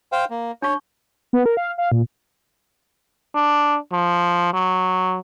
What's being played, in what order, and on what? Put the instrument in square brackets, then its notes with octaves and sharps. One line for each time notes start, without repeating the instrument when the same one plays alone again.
[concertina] C5 F5 G5
A#3
[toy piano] D4 C#6 [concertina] C#5
[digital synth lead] B3
A#4
F5
F5
A#2
[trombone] D4
F3
F#3